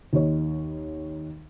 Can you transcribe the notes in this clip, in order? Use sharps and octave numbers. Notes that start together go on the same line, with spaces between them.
D#2 D#4 C#5